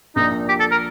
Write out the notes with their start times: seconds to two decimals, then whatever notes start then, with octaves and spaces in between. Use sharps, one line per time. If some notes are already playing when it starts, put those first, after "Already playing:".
0.16 A#1 A#2 D#4
0.49 G4
0.60 A4
0.71 A#4